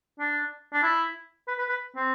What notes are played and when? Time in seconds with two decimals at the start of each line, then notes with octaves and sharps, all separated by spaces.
0.20 D4
0.73 D4
0.83 E4
1.48 B4
1.58 B4
1.69 B4
1.96 C4